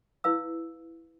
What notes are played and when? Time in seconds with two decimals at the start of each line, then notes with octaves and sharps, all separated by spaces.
0.24 E4 B4 F5 E6